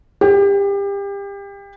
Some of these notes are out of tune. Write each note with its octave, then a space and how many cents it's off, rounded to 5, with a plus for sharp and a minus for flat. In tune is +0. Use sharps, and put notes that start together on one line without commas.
G4 +30